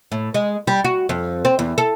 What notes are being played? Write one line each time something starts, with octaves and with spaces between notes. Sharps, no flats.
A2
G#3
G3
F#4
F2
C4
E2
A4